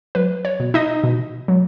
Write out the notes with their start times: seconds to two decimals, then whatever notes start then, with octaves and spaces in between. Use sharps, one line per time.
0.15 F#3 B4
0.45 C#5
0.60 B2
0.74 D#4 D#5
1.04 B2
1.48 F#3